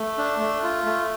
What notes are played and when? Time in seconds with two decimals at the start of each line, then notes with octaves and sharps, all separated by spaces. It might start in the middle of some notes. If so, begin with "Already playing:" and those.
Already playing: A3
0.18 D4
0.40 A3
0.63 F4
0.86 A3